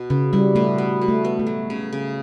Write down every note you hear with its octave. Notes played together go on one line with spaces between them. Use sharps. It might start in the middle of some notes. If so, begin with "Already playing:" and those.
Already playing: B2
C#3 B3
G3 E4
B2 A3
B3
B2
A3
B3
A3
F#3
C#3
C#3